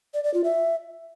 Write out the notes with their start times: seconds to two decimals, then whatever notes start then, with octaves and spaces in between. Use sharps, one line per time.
0.14 D5
0.24 D5
0.34 F4
0.44 E5